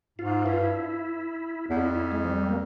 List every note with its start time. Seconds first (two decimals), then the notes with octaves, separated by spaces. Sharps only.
0.18 G#2 F4
0.45 G2 E4
0.53 F4
0.61 E4
1.70 E2
1.77 F2 E4
1.95 E4
2.12 G#3
2.24 F3
2.30 G3
2.49 A#3